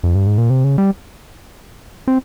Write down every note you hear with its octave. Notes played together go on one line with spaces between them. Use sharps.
F2
G2
G#2
A#2
C3
C#3
G3
C4